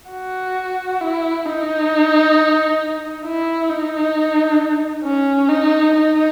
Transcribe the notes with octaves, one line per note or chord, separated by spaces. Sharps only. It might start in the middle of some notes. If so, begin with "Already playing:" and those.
F#4
E4
D#4
E4
D#4
C#4
D#4
D#4